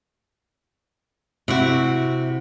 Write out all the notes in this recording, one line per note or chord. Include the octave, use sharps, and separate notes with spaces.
C3 E4 F#4